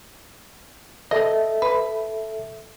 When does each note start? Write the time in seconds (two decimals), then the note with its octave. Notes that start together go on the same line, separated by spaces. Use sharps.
1.11 A4 D#5 E5
1.62 B4